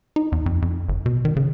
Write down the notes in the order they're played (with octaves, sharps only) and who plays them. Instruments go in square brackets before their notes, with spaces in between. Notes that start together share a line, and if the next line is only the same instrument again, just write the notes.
[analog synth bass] D#4
E2
F2
F2
G1
B2
D#3
C#3